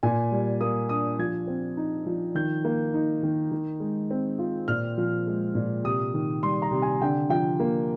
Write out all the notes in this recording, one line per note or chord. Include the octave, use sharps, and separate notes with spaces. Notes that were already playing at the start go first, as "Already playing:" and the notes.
A#2 G#5
G3
A#3 D#6
D4 D#6
F3 G#6
C4
D#4
F3
D#3 G6
A#3
D#4
D#3
D#3
G#3
C4
F4
A#2 F6
F3
G#3
A#2
C3 D#6
D#3
G3 C6
A#5
C3
G#5
D3 G5
F3 G5
A#3